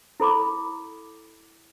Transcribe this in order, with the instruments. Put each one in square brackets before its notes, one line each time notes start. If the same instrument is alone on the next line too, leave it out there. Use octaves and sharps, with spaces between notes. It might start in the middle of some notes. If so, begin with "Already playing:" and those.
[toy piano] E4 A4 B5 D6